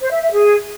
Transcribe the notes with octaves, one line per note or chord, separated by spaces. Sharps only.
C5
E5
E5
G#4